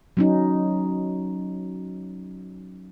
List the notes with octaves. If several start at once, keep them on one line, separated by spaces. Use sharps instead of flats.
F#3 C#4 D#4